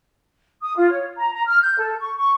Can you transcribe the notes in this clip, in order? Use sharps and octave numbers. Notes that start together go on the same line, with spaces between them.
D#6
F4
C#5
A#5
A#5
F6
G6
A4
C#6
C#6